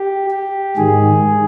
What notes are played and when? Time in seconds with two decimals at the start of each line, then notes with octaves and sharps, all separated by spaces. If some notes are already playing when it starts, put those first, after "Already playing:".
Already playing: G4
0.30 G4
0.77 G#2 D#3 G#4